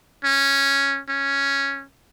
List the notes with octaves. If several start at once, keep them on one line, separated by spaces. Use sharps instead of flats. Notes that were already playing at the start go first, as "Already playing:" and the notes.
C#4
C#4